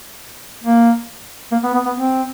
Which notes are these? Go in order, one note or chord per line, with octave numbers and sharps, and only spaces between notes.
A#3
A#3
B3
B3
B3
C4